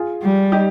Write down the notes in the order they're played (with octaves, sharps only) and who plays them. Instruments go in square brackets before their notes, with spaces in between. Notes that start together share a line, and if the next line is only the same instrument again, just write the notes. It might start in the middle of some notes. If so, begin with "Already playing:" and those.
Already playing: [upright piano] F4 G#4
[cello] G3
[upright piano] D#4 G4